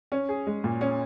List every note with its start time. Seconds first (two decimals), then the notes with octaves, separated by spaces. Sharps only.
0.12 C#4
0.29 G#4
0.47 G#3
0.64 A#2
0.81 C#4